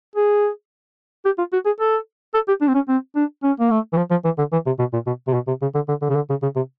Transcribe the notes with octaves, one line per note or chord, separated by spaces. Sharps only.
G#4
G4
F4
F#4
G#4
A4
A4
G4
D4
C4
C#4
C4
D4
C#4
A#3
A3
E3
F3
F3
E3
D3
E3
C3
B2
A#2
B2
C3
B2
C3
C#3
D3
D3
D3
C#3
D3
C#3
C#3
C3